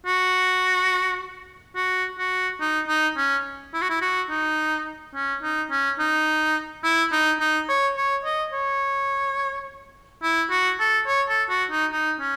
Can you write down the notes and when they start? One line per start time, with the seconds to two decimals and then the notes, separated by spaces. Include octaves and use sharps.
0.06 F#4
1.76 F#4
2.18 F#4
2.60 D#4
2.88 D#4
3.17 C#4
3.74 E4
3.82 F#4
3.90 E4
4.02 F#4
4.30 D#4
5.15 C#4
5.43 D#4
5.71 C#4
5.99 D#4
6.84 E4
7.12 D#4
7.40 D#4
7.69 C#5
7.97 C#5
8.25 D#5
8.53 C#5
10.23 E4
10.50 F#4
10.80 A4
11.07 C#5
11.29 A4
11.49 F#4
11.71 D#4
11.92 D#4
12.20 C#4